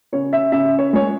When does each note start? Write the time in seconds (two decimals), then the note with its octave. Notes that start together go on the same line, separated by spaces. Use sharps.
0.13 C#3 C#5
0.33 E5
0.52 C#3 E5
0.79 C#5
0.93 G#3 C#5